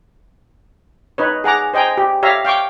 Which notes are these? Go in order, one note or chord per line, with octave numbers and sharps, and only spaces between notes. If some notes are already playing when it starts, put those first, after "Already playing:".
D#4 B4 C#5
G#4 F#5 A#5 D6
C5 D#5 G5 G#5 A#5
G4
G4 C#5 E5 F5 A#5
F5 G5 C#6 D6